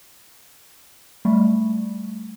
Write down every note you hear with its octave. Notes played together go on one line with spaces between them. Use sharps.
G3 A3